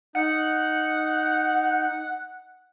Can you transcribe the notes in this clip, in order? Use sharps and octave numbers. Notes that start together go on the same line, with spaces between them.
D#4 F#5